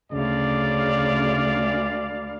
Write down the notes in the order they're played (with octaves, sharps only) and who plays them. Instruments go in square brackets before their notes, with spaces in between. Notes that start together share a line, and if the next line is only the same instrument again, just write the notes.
[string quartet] D2 F5 [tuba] C#3 [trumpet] D5